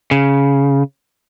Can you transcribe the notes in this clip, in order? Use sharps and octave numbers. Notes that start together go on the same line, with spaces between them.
C#3